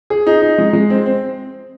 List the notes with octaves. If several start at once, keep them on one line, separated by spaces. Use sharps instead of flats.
G#4
D#4
D#4
G#3
G#3
C4
C4